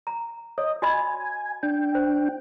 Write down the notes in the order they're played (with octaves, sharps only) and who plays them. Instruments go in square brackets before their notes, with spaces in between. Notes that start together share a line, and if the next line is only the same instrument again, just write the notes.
[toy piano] A#5
[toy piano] C#5 [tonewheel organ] D#5
[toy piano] F#4 D#5 B5 [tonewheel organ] G#5
[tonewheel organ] D4 G5
[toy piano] C5